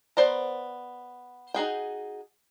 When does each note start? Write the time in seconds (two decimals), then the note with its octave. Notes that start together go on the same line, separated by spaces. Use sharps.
0.17 B3 C5 D5 A#5
1.54 D#4 F#4 G#4 G5